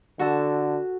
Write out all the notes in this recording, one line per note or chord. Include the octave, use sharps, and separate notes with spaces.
D3 F#4 A4